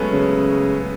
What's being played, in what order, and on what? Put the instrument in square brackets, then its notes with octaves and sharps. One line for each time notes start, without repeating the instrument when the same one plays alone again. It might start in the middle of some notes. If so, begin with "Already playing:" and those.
Already playing: [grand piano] F#3 G#3 A3 B3 C#4
[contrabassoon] C#3